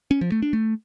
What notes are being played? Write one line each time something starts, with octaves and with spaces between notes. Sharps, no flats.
C#4
F3
A3
D4
A3